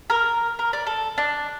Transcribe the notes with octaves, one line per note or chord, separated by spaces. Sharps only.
A#4
A#4
D5
A4
D4